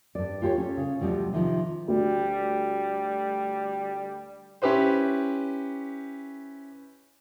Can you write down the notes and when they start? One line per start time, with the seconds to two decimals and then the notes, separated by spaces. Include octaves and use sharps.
0.15 G2 D5
0.42 F4 G4 C5 C#5
0.58 C#4 A4
0.77 C#3
1.00 D2 B2 F3 G3
1.33 C3 D#3 F3
1.88 D2 G3
4.62 C#4 E4 G4 B4 C5